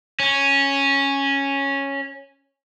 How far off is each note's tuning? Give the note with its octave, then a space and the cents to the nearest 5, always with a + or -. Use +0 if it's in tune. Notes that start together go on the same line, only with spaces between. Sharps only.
C#4 -5